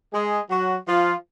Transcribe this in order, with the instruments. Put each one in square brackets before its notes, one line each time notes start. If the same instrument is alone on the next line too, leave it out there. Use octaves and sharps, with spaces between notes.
[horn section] G#3 G#4
F#3 F#4
F3 F4